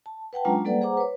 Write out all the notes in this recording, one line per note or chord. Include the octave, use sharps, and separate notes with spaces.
A5
B4 F#5 G5 A5
F#3 G#3 C#4 D4 F4 A#5
G3 A#3 A4 B4 D5 F#5
G#4 C5 F#5 A#5 D6
B4 C#5